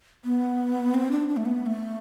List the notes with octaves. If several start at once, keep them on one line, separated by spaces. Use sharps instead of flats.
B3
C4
D4
D4
A3
B3
B3
A3